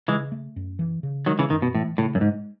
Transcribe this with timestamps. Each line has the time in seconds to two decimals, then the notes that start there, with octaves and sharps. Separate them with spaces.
0.08 C#3 E3 G#3
0.32 A3
0.56 F#2
0.79 E3
1.03 C#3
1.26 D#3 F#3 G#3
1.39 C#3 E3
1.50 F#2 D#3
1.62 B2
1.74 A2 E3
1.98 A2 C#3
2.15 F#2
2.21 G#2 G#3